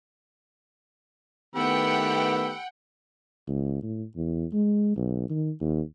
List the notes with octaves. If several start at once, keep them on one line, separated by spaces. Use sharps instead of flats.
D#3 A3 B3 G4 F#5 G5 B5 E6
C#2
A2
E2
G#3
B1
D#3
D#2